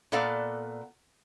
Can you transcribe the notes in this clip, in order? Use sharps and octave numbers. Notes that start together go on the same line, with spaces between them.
A#2 B3 A4 D5 F5 F#5